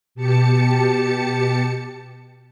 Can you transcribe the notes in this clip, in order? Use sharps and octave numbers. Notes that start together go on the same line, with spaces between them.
B2 G4 A5 C#7